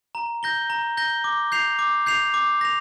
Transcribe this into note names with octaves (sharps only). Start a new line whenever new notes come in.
A#5
G6 A#6 G7
A#5
G6 A#6 G7
D6
G6 C7 F7
D6
G6 C7 F7
D6
A#6 F7